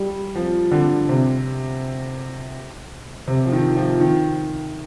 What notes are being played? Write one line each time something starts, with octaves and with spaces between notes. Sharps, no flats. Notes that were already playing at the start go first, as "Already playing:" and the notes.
Already playing: G3
F3
D3
C3
C3
F3
D#3
F3
D#3